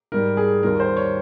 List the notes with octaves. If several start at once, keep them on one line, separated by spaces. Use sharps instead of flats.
G#2 G3 A#4
G#4
D#2 D#3 G3 A#4
C5
C#5